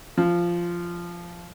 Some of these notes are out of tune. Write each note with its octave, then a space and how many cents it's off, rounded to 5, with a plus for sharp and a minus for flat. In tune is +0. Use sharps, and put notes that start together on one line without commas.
F3 -10